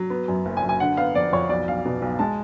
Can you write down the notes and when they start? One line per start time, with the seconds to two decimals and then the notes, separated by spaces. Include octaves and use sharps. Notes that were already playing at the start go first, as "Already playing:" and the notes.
Already playing: F#3
0.10 B3
0.28 F#2
0.45 F#1
0.57 G#5
0.62 F#2
0.69 G#5
0.80 D3 F#5
0.97 B3 F5
1.15 F2 D5
1.33 F2 C#5
1.49 B1 D5
1.68 B1 F5
1.85 B2
2.02 B1
2.19 G#3 A5